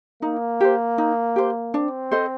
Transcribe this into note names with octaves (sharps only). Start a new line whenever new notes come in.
A#3 D#4
G4 C5
D#4
G4 C5
C4 D4
A4 C5 D#5